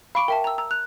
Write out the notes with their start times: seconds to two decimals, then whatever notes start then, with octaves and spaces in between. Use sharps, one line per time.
0.15 F5 B5 C#6 D6 D7
0.28 A#4 E5 G5 A5
0.44 A#5 E6
0.58 A#5 E6
0.71 F#6 F7